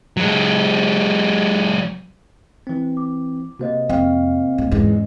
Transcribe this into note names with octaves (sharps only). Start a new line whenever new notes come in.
F#3 G#3
E3 C4
D6
C3 A#3 F#4 C5 D#5
F2 C4 F5
A2
E2 G#2 E3 G#3 C#4